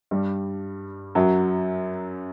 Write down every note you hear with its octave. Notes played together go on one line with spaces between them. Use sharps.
G2 G3
F#2 F#3